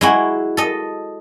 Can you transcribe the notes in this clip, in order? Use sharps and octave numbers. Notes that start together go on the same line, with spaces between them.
G#3 E4 F#4
A4 D#5